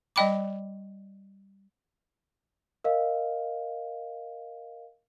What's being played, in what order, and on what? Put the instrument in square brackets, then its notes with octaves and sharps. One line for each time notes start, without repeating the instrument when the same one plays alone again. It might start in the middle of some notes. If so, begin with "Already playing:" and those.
[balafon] G3 D5 D#5 G5 B5 D6
[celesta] A#4 D#5 F5